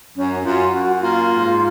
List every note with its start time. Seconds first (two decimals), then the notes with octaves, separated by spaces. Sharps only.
0.16 F#2 C#4
0.44 F#2 F4
0.73 F#2 F#4
1.01 A#3 F4
1.30 G#2